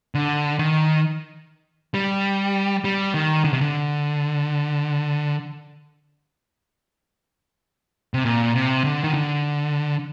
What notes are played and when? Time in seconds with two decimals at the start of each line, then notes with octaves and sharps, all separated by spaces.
0.15 D3
0.59 D#3
1.94 G3
2.84 G3
3.14 D#3
3.44 D3
3.53 C3
3.61 D3
8.14 C3
8.25 A#2
8.55 C3
8.84 D3
9.04 D#3
9.14 D3